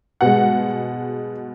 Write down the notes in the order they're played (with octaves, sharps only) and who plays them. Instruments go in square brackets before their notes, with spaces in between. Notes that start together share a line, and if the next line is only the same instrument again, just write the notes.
[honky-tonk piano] B2 G#3 F#5